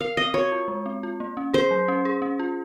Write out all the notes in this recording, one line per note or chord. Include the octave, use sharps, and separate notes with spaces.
A#4 F5
C4 D#5
F#4 C#5
F4
G#3
C4
F4
A#3
C#4
G#4 C5
F#3
C#4
G#4
C#4
F4